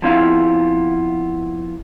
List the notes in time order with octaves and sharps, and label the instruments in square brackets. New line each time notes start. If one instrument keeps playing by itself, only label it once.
[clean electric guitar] F3 B3 C4 E4 F4 F5